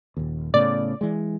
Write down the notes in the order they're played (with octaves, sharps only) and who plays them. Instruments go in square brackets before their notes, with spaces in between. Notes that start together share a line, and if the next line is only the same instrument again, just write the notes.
[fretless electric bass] D#1 D#2
[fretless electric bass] A2 C#3 B3 [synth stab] D5
[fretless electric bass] E3 G#3